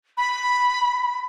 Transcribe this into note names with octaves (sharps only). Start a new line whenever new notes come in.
B5